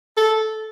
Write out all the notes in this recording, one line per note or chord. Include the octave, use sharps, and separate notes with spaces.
A4